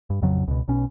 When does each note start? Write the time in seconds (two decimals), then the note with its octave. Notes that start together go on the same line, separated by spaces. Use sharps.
0.10 G2
0.22 A1 F2 C#3 F#3
0.48 C#2 B2
0.68 B1 B2 C#4